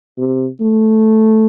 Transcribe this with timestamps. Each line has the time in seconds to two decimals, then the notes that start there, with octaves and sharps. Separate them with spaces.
0.18 C3
0.61 A3